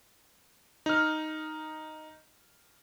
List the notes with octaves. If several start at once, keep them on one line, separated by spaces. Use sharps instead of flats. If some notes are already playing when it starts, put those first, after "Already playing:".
D#4 F6